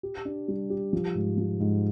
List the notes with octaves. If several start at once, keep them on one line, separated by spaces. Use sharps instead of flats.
G4
D4
G3
G4
F3
G#2
F3
G#2